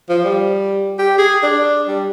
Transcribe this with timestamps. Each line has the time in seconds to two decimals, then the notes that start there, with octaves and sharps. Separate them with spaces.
0.09 F3
0.25 G3
0.99 G4
1.18 G#4
1.43 D4
1.88 G3